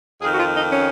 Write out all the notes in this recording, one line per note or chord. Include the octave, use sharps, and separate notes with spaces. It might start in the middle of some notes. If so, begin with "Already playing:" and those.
F2 D#3 G#4
F#4
F4
D#4
C#4